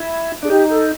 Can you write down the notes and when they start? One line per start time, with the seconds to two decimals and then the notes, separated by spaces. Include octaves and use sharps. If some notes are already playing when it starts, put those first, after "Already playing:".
Already playing: E4
0.43 D4 G#4
0.50 D#4 G4
0.70 A4